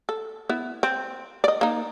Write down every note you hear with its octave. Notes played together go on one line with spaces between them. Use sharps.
A4
B3 E4
C4
D5 D#5
A#3 D#4